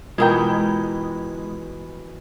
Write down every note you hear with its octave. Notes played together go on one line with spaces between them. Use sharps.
B2 E3 G#3 F4 A#4 G5 A#5